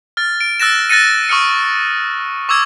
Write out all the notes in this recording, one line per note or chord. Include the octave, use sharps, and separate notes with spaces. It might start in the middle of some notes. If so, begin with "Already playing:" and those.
F6 A6
D7
E6 F#6 A6 A#6 E7
F#6 A6 A#6 C#7 D#7
C#6 D#6 F6 C#7
C#6 D6 E6 G#6